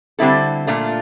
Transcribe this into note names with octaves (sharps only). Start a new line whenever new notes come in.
D3 G3 C4 E4 A4
A#2 A3 D4 F4